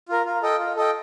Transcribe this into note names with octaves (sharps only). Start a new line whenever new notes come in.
F4 A#4
F4
A4 D#5 G5
F4
A4 D#5 G5